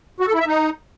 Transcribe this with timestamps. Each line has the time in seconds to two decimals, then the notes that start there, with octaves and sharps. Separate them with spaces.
0.20 F#4
0.27 A4
0.34 E4
0.40 E5
0.47 D#4